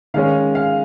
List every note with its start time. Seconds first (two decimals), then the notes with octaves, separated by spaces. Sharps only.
0.14 D#3 G#3 C#4 F5
0.55 F5